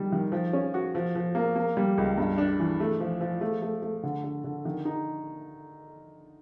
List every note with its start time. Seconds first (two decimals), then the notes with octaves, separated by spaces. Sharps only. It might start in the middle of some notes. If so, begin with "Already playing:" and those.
Already playing: D#3 G3
0.12 D#3
0.32 F3
0.53 C#4
0.74 F#4
0.95 F3
1.15 F3
1.35 A#3
1.56 A#3
1.77 G3
1.98 C#2
2.18 G2
2.38 D4
2.60 E3
2.80 A3
3.00 F3
3.21 F3
3.41 A3
3.62 A3
3.82 A3
4.03 D3
4.24 D3
4.44 D3
4.65 D#3
4.85 D#4